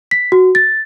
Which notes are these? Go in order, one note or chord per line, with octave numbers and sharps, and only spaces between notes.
B6
F#4
A6